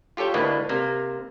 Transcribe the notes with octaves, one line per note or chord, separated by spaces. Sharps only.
F4 G4 A4 C#5 G5
D2 A2 A#3 D4 B4 D#5
C3 A#3